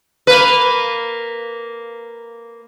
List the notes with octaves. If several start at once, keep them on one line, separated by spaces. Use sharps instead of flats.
A#3 B4